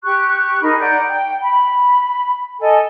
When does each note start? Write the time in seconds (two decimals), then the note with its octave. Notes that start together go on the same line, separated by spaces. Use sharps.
0.04 G4 C#6 F#6
0.63 D#4 G#4 A#4 B5
0.80 D5 F#5 A#5 G6
1.09 G5
1.43 B5
2.61 A4 D#5 G#5